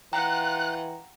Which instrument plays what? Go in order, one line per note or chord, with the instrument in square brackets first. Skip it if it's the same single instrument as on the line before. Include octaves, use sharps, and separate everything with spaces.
[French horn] E3 [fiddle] F4 F#5 [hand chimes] G5 A#5 [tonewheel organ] F#6